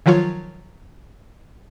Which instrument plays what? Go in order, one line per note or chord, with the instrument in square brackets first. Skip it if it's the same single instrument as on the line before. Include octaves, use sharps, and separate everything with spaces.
[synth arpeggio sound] D#3 F3 F#3 F4 C#5